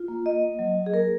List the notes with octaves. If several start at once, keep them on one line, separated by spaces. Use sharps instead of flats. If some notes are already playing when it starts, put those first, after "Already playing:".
Already playing: F4
A#3
A#3 D#5
A#3
F#3
F#3
G#4
A#3 A#4